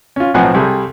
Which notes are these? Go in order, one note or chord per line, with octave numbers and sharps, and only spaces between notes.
C#4 F4
B1 A2 F3 C4 F#5 G#5
C2 C3 G3 G#4 A4